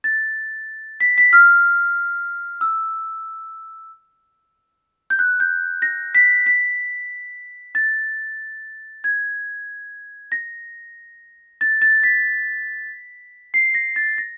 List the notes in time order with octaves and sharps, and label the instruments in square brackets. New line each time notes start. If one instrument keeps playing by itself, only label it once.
[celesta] A6
B6
B6
F6
E6
G6
F#6
G6
A#6
B6
B6
A6
G#6
A#6
A6
A6
B6
C7
A#6
A6
A#6